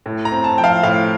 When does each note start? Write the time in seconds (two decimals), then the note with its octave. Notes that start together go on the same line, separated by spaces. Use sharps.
0.06 A2
0.25 A#5
0.32 C4
0.44 A5
0.58 F3 G5
0.64 F5
0.83 A2 F5